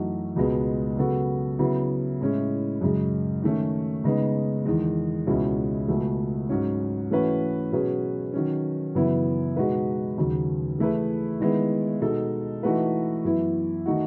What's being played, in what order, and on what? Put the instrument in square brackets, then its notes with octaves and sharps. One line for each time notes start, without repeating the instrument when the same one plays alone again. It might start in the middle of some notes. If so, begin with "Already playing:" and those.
Already playing: [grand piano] F#2 E3 A3 D#4 F#4
C#2 B2 G#3 B3
C#3 F#3 B3 F#4 A4
C#3 F#3 B3 E4
A2 G#3 C#4 E4
F#2 C#3 G#3
D#3 A3 C#4
C#3 G#3 B3 D#4
E2 D#3 G#3
C#2 B2 G#3 C#4 E4
C#2 B2 A3
G#2 F#3 C#4
E3 A3 C#4 F#4 B4
B2 F#3 C#4 G#4 B4
D#3 F#3 C#4
F#2 C#3 E3 B3 E4
B2 G#3 D#4 F#4 B4
D#2 C#3 F#3
E3 A3 E4 G#4 B4
D#3 G#3 B3 E4
B2 G#3 D#4 A4
E3 A3 D#4 F#4 B4
F#2 E3 B3 E4
D#3 A3 D#4 F#4